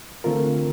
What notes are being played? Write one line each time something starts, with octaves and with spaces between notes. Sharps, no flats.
D3 A3 C4 F4 A#4